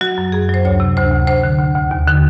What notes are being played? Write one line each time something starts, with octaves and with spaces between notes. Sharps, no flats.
F#3 F#4
F#2
F#2 G#4
F#3 C5
D2 C#5
C3
D2 C5
D2
D2 C5
D3
D2
D2
D#2
D3